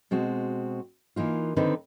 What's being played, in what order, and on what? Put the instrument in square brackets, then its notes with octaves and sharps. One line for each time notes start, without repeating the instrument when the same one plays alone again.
[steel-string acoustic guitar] B2 G#3 C4 F#4
E3 A#3 D#4 F4
D3 D#3 C4 D#4 B4